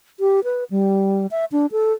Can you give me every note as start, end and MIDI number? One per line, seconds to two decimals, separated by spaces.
0.20 0.43 67
0.44 0.64 71
0.71 1.27 55
1.31 1.45 76
1.52 1.66 62
1.72 1.93 69